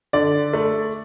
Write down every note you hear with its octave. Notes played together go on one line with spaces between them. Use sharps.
D3 D5
A3